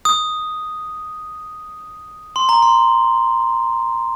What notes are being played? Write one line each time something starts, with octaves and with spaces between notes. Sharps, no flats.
D#6
C6
A#5
C6